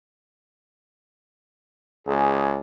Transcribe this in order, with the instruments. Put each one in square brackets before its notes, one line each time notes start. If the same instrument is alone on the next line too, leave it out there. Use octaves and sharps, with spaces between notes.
[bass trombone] C#2 [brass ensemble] G#4